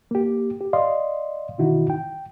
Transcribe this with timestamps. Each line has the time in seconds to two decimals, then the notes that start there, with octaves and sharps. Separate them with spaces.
0.11 A#3 G4
0.61 G4
0.73 D5 D#5 F5 C6
1.58 B2 D#3 E3 D#4 E4 F#4
1.90 G5